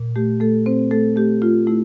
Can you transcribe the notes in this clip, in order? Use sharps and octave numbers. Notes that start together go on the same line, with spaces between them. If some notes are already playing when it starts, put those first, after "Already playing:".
Already playing: A#2
A3 G4
A3 A4
C4 C5
A3 A4
A3 G4
A3 F4
A3 E4